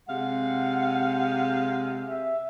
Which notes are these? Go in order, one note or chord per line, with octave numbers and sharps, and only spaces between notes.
C3 G#3 F5 F#5
E5